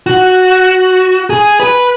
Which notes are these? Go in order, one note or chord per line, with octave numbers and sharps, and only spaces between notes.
F#4
G#4
B4